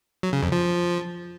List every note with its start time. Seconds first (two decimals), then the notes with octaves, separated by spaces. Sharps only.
0.23 F#3
0.33 C#3
0.43 F2
0.52 F3